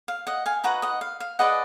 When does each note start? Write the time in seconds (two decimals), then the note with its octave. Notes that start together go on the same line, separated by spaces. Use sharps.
0.08 F5
0.27 D#5 F#5
0.46 F5 G#5
0.64 D#4 F#4 B4 F#5 A#5
0.82 D#5 F#5
1.01 F5
1.20 F5
1.39 G#4 B4 D5 D#5 F#5